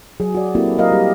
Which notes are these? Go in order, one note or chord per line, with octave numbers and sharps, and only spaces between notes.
F#3 G#4
F#4 D5
A#3 C4 E4 F#4 G4 A4
F#3 A#3 A#4 D#5 F5
G3 G4